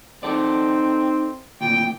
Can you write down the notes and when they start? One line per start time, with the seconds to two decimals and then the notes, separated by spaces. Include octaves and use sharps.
0.23 C4 D#4 A4 D5
1.61 D2 A#2 G5